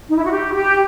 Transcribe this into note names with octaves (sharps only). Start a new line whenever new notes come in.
D#4
E4
F#4
G4
G4